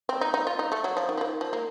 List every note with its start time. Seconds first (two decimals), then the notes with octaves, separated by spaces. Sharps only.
0.09 C4
0.21 D#4
0.34 D#4
0.47 F4
0.59 D#4
0.72 A3
0.84 F#3
0.97 F3
1.09 D#3
1.17 F3
1.21 D#3
1.41 F3
1.53 A#3